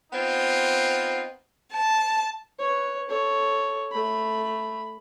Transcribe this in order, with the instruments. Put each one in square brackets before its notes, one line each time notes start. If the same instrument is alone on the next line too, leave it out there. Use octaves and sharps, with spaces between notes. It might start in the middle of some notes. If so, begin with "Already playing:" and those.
[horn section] B3 C4 D#4 F4
[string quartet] A5
[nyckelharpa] B4 C#5
A4 C#5
A3 B5